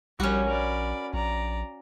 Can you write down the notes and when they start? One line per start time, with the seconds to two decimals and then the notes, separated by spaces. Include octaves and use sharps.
0.20 A#1 G3 C#4 F#4
0.49 A#4 D5 B5
1.14 A#1 D5 A#5